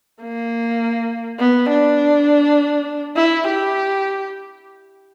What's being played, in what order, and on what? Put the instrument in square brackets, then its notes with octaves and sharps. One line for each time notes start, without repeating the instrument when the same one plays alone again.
[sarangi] A#3
B3
D4
E4
G4